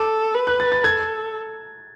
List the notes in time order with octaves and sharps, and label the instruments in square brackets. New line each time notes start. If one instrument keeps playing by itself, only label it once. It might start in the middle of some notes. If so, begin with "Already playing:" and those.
Already playing: [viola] A4 [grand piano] D6
[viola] B4
[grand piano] F#6
A6
A6
[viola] A4 [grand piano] G#6